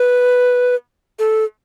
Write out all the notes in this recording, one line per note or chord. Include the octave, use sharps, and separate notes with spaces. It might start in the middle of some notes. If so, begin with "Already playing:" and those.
Already playing: B4
A4